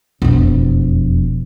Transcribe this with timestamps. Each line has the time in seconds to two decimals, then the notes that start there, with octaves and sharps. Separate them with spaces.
0.22 E1 F2